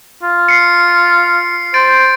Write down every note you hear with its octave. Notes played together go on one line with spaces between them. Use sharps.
F4
C7 C#7
C5 A6 D7